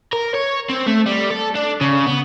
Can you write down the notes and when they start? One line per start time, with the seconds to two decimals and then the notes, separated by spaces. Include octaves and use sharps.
0.13 A#4
0.34 C#5
0.69 C4
0.87 A3
1.06 G3
1.31 A4
1.55 D4
1.81 C#3
2.06 B3